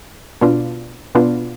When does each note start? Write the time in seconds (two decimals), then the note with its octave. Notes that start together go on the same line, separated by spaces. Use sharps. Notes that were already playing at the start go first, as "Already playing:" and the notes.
0.41 B2 B3 D4 F4
1.15 B2 B3 D4 F4